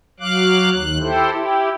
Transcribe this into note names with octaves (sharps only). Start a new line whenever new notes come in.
F#3 F5 D6 F#6
D#2 F#6
E4 G4 A4 C5
E4 G4